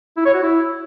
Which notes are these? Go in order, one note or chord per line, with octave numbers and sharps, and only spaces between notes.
E4
C#5
F#4
E4